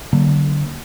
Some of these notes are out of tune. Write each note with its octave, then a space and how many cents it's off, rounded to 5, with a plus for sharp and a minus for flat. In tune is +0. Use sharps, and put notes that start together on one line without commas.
D3 +0 F#3 +40 A#3 +0